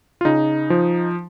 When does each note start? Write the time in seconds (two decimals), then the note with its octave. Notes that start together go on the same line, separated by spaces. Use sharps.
0.21 F4
0.25 C#3 D#4
0.70 F3